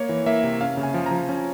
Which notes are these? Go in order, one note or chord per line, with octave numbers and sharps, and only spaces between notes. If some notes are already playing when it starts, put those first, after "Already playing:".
Already playing: A#3 C#5
E3
A#3 E5
C3
C#4 F5
C#3
G#5
F3
A#5
F3
C#4